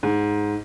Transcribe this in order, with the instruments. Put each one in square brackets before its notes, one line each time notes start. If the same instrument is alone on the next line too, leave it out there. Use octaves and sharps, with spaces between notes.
[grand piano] G#2